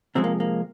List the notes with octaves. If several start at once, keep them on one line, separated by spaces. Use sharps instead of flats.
C3 F3 G#3 C4
A#3
A#3